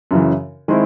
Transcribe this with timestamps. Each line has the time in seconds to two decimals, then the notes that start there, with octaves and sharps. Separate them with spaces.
0.11 F#2 C#3 E3
0.68 D#3 G#3 C4 E4